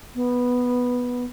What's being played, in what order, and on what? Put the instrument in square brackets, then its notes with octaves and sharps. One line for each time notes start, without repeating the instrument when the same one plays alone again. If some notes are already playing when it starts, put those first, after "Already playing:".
[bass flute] B3